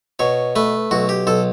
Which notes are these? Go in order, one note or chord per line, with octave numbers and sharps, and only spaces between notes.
B2 C#5
A3 B4
B1 F#4
G4
B1 A4